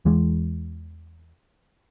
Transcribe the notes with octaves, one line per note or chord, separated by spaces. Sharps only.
E2 E3 G#3